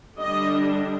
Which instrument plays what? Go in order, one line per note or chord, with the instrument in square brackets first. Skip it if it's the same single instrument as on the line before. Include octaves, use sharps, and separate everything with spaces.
[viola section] D3 G3 D4 D#5